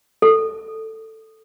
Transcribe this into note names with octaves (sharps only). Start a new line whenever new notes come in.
A4